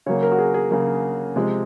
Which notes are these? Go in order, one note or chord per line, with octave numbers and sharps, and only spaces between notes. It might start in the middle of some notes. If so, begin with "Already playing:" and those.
C#3 F#3 A#3 C#5
A#4
F#4
G#4
G#4
C#3 F#3 A#3
C3 F3 G#3